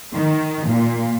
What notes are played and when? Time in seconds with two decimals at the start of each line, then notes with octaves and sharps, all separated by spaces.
0.14 D#3
0.67 A#2